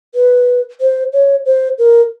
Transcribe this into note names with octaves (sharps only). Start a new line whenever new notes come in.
B4
C5
C#5
C5
A#4